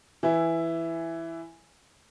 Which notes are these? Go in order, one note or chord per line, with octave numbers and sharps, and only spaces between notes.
E3 E4